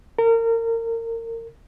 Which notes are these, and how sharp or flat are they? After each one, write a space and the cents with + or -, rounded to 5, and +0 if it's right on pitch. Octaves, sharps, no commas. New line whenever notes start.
A#4 -30